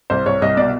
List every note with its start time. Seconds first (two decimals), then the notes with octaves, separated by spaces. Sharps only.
0.10 C2 C5
0.26 C2 C#5
0.42 C2 D#5
0.57 B2 D5